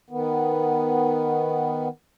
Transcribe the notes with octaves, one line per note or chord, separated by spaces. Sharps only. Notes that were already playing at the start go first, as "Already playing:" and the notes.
D#3 B3